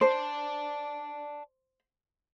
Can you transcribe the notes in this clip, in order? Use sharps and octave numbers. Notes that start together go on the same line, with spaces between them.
C5 D5 A5